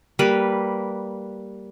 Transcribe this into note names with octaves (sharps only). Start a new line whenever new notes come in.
G3 A#3 B4